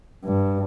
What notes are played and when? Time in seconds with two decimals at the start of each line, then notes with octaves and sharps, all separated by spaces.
0.24 G2